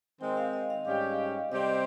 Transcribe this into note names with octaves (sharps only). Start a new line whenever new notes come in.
D#3 G#3 C4 G5
F5
D#5
F5
G#2 G3 C#4 G4 F5
C3 G3 C4 G4 C5 D#5